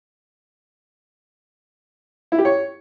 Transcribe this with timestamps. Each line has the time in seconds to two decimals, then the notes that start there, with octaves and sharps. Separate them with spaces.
2.32 E4
2.38 G4
2.45 C#5